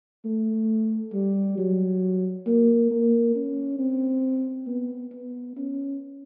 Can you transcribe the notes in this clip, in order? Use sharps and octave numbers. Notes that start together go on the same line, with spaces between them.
A3
G3
F#3
A#3
A#3
C#4
C4
B3
B3
C#4